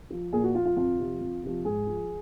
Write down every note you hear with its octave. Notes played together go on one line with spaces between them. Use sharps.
F3
A#2 G#4
F#4
F3 F4
F4
F2 F4
C3 F3
F2
C3 F3
G#2 G#4
F3